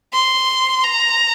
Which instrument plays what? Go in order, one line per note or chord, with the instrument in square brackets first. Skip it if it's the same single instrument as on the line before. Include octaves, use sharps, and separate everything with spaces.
[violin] C6
A#5